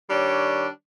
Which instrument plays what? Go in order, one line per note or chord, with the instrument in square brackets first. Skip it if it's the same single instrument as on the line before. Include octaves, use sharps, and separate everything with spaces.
[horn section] D#3 G3 D4 C#5